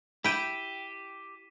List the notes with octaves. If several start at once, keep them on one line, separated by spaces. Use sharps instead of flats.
E4 G4 G5 B6 D#7 E7